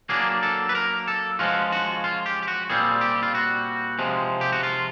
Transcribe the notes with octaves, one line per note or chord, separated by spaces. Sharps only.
F#3 A#3 D4 G#4
A4
B4
A#4
A4
F3 G#3 C#4 F4 F#4
F#4
F4
G4
G4
F#4
A#2 G3 C4 F4 G#4
G4
F4
F#4
C3 F3 G#3
G4
F#4
F4